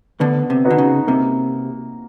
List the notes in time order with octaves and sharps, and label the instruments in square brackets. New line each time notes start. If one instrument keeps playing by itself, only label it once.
[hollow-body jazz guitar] D2 D3 [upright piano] B3
[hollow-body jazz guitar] C3
[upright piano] D#4 F#4 B4
[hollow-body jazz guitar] D3
C#3
[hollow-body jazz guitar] C3 [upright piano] A#3